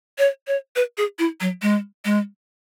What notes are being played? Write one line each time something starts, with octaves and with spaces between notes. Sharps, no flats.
C#5
C#5
B4
G#4
E4
F#3
G#3
G#3